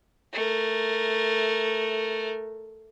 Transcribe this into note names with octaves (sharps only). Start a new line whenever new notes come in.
A3 A#4